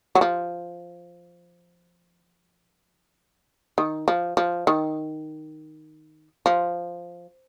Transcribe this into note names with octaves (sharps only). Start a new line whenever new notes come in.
F#3
F3
D#3
F3
F3
D#3
F3